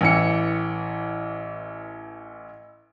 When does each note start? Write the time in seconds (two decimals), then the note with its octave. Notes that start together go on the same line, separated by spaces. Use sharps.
0.01 A1 E3 C#7